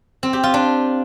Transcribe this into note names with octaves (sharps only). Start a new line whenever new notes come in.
C4
G4
F4
D4